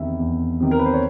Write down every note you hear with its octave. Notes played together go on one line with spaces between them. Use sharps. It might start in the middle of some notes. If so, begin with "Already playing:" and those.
Already playing: E2 C3 D#3 E5
E2
C3 D#3
A#4
B4
C5
C#5